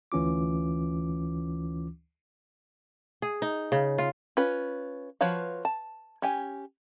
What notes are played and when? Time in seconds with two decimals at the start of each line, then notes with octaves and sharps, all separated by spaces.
0.12 D2 E3 C#4 F4 D6
3.22 G#4
3.42 D#4
3.72 C#3
3.98 F4
4.37 C#4 F4 B4
5.21 F3 F#4 B4 C#5 F5
5.65 A5
6.22 C#4 G4 G#5